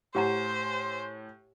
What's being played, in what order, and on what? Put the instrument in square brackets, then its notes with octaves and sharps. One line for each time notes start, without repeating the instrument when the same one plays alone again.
[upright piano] A2 G#5 [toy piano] G4 F#5 A#5 [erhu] C5